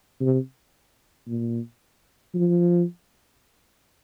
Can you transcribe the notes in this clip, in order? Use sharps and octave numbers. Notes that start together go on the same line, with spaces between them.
C3
A#2
F3